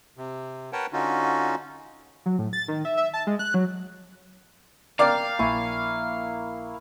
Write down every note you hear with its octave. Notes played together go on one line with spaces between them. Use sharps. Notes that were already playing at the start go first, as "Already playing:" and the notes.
C3
A#4 B4 C#5 F#5 G5 A5
D3 C#4 D#4 F4 F#4
F#3
A2
A6
D#3
E5
E5
A5
G#3
F#6
F#3
A#3 D5 F5 G5 D6
A#1 E4 G#5 C#6